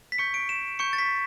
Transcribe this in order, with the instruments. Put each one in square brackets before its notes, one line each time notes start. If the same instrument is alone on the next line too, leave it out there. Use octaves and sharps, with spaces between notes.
[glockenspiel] B6
C#6 G6 C#7
D7
E7
C#6 G6 C#7
A6
B6